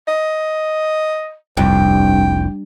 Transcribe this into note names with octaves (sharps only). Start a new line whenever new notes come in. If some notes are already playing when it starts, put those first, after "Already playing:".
D#5
F1 C2 G2 G5